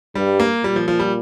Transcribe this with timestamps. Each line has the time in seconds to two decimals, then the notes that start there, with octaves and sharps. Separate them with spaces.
0.15 G2 G3
0.40 A#3
0.63 A#2 G3
0.76 F3
0.88 F3
1.00 G3